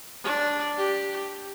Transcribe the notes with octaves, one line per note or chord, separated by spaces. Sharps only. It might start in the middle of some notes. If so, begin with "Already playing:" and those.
D4
G4